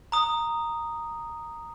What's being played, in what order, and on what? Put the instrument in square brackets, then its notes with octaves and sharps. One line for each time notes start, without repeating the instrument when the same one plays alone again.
[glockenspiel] A#5 D#6